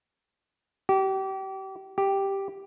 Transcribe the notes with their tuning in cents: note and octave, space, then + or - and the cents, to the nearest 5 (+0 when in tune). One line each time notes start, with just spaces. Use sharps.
G4 -30
G4 +0